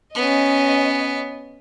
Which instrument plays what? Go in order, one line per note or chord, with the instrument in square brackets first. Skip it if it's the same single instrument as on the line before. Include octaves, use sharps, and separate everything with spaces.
[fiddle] B3 [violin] C#4 D#5